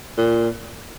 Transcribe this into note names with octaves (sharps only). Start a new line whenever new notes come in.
A#2